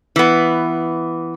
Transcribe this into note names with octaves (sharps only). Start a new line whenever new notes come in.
E3 B3